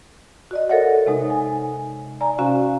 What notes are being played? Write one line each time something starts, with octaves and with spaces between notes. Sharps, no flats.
F#4 D5 D#5
A4 A#4 C#5 D#5 E5 F#5
C3 G#3 D#4
G#5
D5 G#5 A#5
C3 C#4 F#4 F5